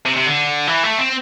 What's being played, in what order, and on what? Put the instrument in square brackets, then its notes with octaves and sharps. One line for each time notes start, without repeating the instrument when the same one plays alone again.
[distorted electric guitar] C3
C3
D3
E3
A3
C4